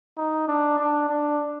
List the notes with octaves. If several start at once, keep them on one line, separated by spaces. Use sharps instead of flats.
D#4
D4
D4
D4